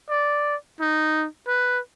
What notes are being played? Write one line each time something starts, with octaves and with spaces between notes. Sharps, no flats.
D5
D#4
B4